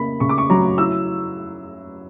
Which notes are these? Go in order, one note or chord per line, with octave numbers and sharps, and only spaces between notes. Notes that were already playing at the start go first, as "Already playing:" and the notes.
Already playing: C#3 A#3 B5
C#3 C#6
D6
C#6
F#3 A#5
E4 E6